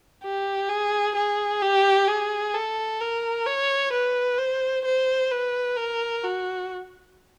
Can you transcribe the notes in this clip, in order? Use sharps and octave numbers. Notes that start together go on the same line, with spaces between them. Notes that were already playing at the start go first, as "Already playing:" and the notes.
G4
G#4
G#4
G4
G#4
A4
A#4
C#5
B4
C5
C5
B4
A#4
F#4